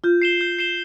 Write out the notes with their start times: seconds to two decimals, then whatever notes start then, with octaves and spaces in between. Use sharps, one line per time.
0.04 F4 G6
0.22 C7 E7 G7
0.41 G6
0.58 C7 E7 G7